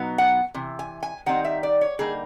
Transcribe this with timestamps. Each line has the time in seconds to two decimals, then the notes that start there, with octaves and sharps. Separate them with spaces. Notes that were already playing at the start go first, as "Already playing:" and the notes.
Already playing: B2 F#3 B3 D#4
0.18 F#5
0.54 C3 E3
0.79 G#5
1.03 G#5
1.26 D#3 G3 C4 D#4 F#5
1.45 E5
1.63 D5
1.81 C#5
1.99 D3 G3 A#3 D#4 G#4